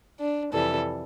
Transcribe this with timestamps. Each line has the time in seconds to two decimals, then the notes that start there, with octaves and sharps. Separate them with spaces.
0.19 D4
0.53 F2 C3 E3 G3 A4